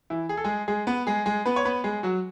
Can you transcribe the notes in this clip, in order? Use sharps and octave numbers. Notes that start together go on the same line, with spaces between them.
E3 E4
G#4
A4
G#3 G#4
G#3 G#4
B3 B4
G#3 G#4
G#3 G#4
B3 B4
C#5
B3 B4
G#3 G#4
F#3 F#4